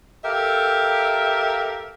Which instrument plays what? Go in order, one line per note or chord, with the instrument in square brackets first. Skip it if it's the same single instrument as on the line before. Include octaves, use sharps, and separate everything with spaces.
[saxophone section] G4 A4 A#4 E5 F5